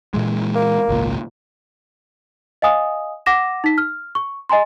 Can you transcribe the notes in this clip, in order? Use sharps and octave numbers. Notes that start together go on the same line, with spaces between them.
A#2 E3 G#3
A#3
G#1 C#2 A#2
D#5 F5 G#5 D#6
F#5 D6 A#6 E7
D#4 B6
F6
C#6
D#5 G#5 A#5 C6